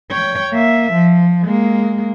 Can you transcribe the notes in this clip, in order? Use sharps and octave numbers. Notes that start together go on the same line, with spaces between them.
C#5 G5
A#3 E5
F3
G#3 A#3